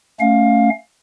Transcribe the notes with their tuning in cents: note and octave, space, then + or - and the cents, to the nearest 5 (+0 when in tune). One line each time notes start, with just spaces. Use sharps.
A3 +10 C#4 +5 F5 +20